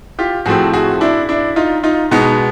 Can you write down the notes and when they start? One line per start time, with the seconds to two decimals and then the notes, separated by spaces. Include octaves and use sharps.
0.19 F4 G4
0.46 A2 F3 A3 C4 F#4 G#4
0.73 F#4 G#4
1.01 D4 E4
1.29 D4 E4
1.56 D#4 F4
1.83 D#4 F4
2.11 B2 G#3 B3 D#4